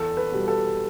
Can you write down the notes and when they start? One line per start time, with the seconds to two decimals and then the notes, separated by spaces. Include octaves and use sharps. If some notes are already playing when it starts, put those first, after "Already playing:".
Already playing: E2 A4
0.17 B4
0.32 B2 G3
0.48 A4